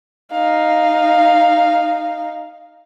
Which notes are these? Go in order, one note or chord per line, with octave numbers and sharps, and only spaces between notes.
D#4 F5